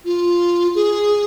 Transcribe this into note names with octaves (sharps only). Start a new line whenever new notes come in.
F4
G#4